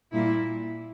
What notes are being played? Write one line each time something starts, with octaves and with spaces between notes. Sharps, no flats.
A#2 G3 A#3 E4